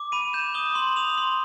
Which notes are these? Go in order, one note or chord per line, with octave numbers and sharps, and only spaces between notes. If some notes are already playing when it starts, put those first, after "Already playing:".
Already playing: D6
B5 D#7
G6 E7
D#6 G7
C6 F#7
D#6 F7
C6